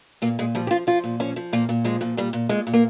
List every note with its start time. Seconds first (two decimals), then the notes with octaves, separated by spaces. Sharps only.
0.22 A#2 A#3
0.39 A#2 G#3
0.55 F3 G3
0.67 G4
0.71 F3 F4
0.87 F3 F4
1.04 A#2
1.20 F3 C#4
1.36 F3
1.53 A#2 A#3
1.69 A#2
1.84 F3 G#3
2.01 A#2
2.17 A#2 G3
2.33 A#2
2.49 A#2 G#3
2.67 A#2
2.74 A#3